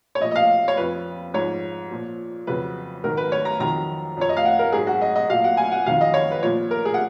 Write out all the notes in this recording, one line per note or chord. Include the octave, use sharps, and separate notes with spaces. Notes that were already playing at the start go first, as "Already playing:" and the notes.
C#5
A#2 F3 D#5
D#5
F5
C#5
F2 F3 B4
G#2 F3 C#5
A#2 F3
F2 C#3 F#3 B4
G#2 D#3 F#3 A#4
B4
C#5
A#5
F2 D#3 F#3 A#5
F#2 F3 C#5
D#5
F5
F#5
A#4
G#2 F#3 G#4
F#4
D#5
D#5
A#2 F#3 F5
F#5
G#5
F#5
F2 D#3 F#3 F5
D#5
C#5
B4
A#2 F3 C#5
A#4
G#4
F#5